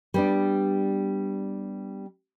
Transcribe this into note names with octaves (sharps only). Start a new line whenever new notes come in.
G3 B3 D4